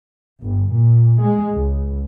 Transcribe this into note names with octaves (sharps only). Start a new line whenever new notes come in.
G1
A#2
G#3
C#2